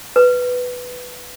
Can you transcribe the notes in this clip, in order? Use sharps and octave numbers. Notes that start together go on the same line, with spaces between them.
B4